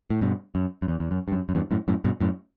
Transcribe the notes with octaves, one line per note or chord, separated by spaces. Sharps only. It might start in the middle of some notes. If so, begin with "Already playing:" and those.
A2
G2 B2
F#2
F#2
E2
E2
F#2
G2
F#2
F#2
E2 G2
F#2 A2
F#2 A2
G2 B2
F#2 A2